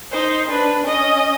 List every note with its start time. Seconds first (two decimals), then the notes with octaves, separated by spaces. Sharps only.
0.11 D#4 C5
0.48 D4 B4
0.84 C#4 D#5